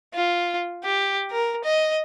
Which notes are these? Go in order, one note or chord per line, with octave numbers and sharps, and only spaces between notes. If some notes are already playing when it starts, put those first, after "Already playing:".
F4
G4
A#4
D#5